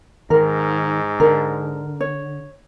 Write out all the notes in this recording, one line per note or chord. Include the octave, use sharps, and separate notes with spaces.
G#2 D#3 A#4
D3 A#4
C#5